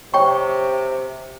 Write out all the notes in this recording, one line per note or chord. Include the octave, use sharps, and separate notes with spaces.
C3 C#5 G5 C#6